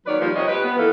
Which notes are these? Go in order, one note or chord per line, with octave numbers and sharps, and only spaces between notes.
D#3 F#3 A#3 B4 C#5 D5
D#3 F3 G3 G#3 A#3 F4
C3 C#5 D#5
G4 B4
B3
E3 A#3 A4